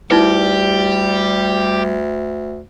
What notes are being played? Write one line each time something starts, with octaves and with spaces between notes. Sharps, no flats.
D2 G3 D#4 E4 G4 B4